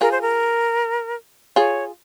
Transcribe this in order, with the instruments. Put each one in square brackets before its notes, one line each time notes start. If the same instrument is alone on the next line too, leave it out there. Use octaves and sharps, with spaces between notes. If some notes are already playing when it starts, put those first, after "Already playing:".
[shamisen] F4 G#4 [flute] A#4
[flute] C5
A#4
[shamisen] F4 G#4 [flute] C#5